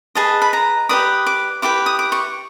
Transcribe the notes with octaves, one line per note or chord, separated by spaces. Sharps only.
G#4 B4 D#5 A5
B5
A#5
G4 B4 D5 D#6
D6
E4 G4 B4 D6
D#6
D6
C#6